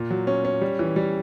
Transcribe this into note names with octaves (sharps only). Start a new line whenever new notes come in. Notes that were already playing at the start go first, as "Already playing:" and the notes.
Already playing: A#2
F#3
C#4
C#4
G3
E3
G3